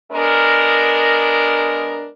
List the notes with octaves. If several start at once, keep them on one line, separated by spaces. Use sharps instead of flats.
G#3 B3 D4 A#4